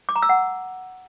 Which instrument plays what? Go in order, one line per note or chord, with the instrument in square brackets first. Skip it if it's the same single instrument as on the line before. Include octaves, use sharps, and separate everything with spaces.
[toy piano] D6
A#5
E6
F#5